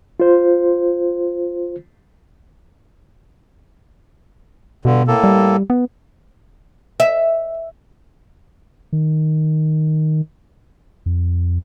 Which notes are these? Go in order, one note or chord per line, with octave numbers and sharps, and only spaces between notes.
F4 C5
G2 B2 D3
A2 A#3 A4
G3
B3
E5
D#3
F2